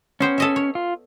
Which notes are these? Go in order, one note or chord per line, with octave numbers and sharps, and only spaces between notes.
B3 C#4 C5 G5
A4 D#5 E5
C#5
F4